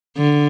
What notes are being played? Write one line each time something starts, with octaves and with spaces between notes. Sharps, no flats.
D3